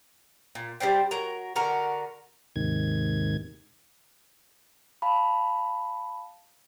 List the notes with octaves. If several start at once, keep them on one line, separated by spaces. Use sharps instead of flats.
A#2
G3 D4 C5 G5
F#3 A#4 A#5
D3 F#4 A#4 A#5
D#2 G#2 C3 D#3 G#6
F5 A5 B5